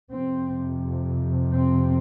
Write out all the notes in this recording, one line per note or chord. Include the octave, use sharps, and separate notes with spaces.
F2 C3 C4
C4